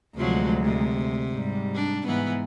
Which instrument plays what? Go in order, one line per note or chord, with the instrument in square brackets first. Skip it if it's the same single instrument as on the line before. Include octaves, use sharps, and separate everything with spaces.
[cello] D2 G#3 [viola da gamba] C3 F3 F#3
[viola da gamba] C3
[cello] G#2 G3
[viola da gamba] D4
[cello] G#2 [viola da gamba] E3 B3